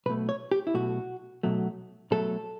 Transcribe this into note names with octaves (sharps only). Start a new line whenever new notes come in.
B1 B2 A3 B4
C#5
G4
E4
B1 B2 A3 F#4
B1 B2 F#3 A3
B1 B2 F#3 A3 A4